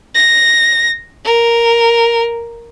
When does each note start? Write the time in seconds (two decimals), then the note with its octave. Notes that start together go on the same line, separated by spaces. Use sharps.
0.15 A#6
1.25 A#4